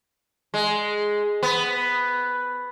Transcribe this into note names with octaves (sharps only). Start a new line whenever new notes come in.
G#3
B3